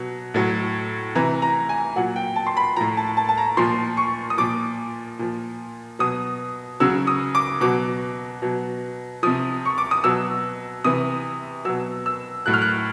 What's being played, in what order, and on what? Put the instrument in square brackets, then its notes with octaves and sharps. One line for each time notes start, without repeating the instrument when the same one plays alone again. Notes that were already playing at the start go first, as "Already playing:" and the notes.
Already playing: [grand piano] B2 F#3
A2 F#3
C3 E3 A#5
A#5
G#5
A#2 F#3 F#5
G5
A5
C6
B5
A2 F3 A#5
A5
A5
A5
A#5
A#2 F3 C6
C#6
D#6
A#2 F3 D6
A#2 F3
B2 F#3 D#6
C#3 F#3 E6
D#6
D6
B2 F#3 D6
B2 F#3
C3 F3 D#6
C#6
D6
D#6
B2 F#3 E6
C3 E3 D#6
B2 F#3 E6
E6
A2 F#3 F#6
F6
F#6